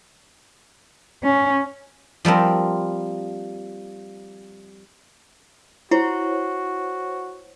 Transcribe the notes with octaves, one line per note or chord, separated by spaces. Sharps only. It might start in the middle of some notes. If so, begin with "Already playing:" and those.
C#4
F3 G3 A#3 C4
E4 F#4 C5 C#5